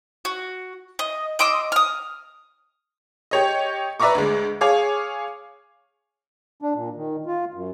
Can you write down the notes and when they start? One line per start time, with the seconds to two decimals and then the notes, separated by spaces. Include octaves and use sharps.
0.25 F#4
0.99 D#5
1.39 D#5 C6 D6 E6
1.72 D#6 F6
3.31 G4 C#5 D#5
4.00 B4 D5 E5 A#5 C#6 D6
4.15 D2 G#3
4.61 G#4 C#5 F5 D6
6.62 D4
6.74 A#2
6.96 D#3
7.26 F4
7.54 F#2